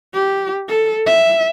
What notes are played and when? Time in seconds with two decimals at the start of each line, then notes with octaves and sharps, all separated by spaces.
0.14 G4
0.69 A4
1.06 E5